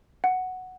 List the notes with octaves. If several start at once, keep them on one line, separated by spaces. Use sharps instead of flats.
F#5